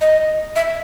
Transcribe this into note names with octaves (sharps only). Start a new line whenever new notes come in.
D#5
E5